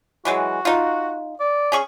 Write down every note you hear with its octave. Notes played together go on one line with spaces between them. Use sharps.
E3 F#3 G#3 F#4
D#4 F4
D5
C#4 G#4 C#6